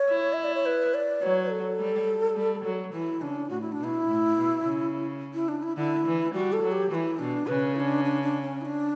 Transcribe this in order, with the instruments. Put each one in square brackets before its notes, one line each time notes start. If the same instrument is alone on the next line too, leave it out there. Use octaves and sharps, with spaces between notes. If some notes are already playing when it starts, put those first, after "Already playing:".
Already playing: [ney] C#5
[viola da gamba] E4
[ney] E5
D5
C#5
B4
D5
[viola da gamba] F#3 [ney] C#5
[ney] A4
[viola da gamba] G3
G3
F#3
[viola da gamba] E3 [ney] E4
[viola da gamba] C#3 [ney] D4
[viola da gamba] A2 [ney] F#4
[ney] E4
D4
[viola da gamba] B2
[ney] E4
[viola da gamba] A2
B2
C#3
[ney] E4
D4
E4
[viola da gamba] D3 [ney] E4
[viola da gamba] E3
[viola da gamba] G3 [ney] F#4
[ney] A4
[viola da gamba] F#3
[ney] G4
[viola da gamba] E3 [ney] E4 F#4
[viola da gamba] B2 [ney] D4
[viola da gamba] C#3 [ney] B4
[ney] E4
D4
D4
D4
C#4
E4
D4